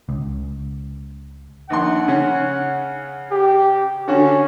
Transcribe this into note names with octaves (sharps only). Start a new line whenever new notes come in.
C#2
A#1 D#2 F#5 C6
C#3 C#4
G4
D3 C#4 F#4